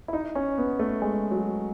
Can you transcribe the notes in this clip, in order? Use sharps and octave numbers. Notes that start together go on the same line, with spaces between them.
E4
D#4
C#4
B3
A3
G#3
F#3